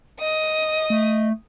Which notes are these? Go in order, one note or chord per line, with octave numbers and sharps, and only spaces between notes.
D#5 D#6
A3